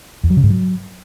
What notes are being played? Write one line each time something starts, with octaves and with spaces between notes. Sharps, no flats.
E2
F#3
C#3
G#2
F#3